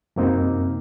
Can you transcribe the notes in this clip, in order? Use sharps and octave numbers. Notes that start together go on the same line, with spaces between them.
F#2 C3 A#3 C4 D#4